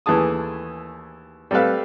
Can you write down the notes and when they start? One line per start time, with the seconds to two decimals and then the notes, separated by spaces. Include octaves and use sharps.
0.06 D#2 E3 A3 G#4 A5 D#6
1.51 G3 A3 C4 A4 B4 F5